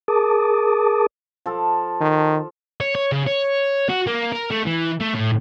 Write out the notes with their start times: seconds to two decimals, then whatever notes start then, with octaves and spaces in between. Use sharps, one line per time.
0.08 G#4 A#4 A5 D6 D#6
1.46 F3 A4
2.01 D#3
2.81 C#5
2.95 C#5
3.12 C#3
3.27 C#5
3.90 F#4
4.07 A#3
4.32 A#4
4.51 A3
4.66 E3
5.01 A3
5.15 A2